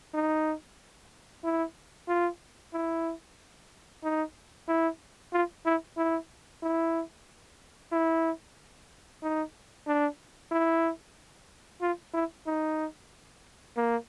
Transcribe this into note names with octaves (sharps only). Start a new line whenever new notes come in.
D#4
E4
F4
E4
D#4
E4
F4
E4
E4
E4
E4
D#4
D4
E4
F4
E4
D#4
A#3